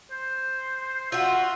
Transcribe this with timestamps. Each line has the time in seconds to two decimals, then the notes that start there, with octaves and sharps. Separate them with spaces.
0.11 C5
1.12 F4 F#4 E5